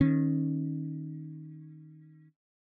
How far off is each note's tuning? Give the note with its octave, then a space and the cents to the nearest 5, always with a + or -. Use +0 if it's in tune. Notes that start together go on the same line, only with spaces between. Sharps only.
D#3 +0 C#4 -25